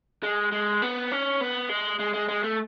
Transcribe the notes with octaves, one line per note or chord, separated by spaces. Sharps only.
G#3
G#3
B3
C#4
B3
G#3
G#3
G#3
G#3
A3